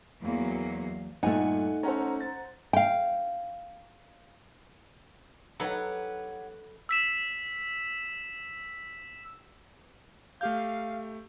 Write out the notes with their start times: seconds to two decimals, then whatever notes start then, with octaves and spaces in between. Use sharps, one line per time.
0.21 E2 F#3 A#3
1.23 G2 A#2 A3 D#4 F#5 G#5
1.83 C#4 A4 C5 F#5 A#5
2.20 A6
2.73 F5 G5
5.60 F#3 D#4 G4 A4 B4 C#5 F#5
6.89 E6 B6 E7
10.41 A3 G4 F5 G6